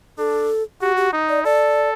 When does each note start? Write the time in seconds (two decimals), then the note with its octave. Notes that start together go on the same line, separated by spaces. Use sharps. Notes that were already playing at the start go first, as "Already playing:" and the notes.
0.18 D4 A4
0.81 F#4 G4
0.97 G4
1.13 D#4
1.29 D5
1.45 A4 D5